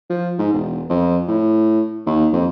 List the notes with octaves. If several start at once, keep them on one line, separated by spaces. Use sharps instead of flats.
F3
G#2
E1
F2
A2
D#2
F2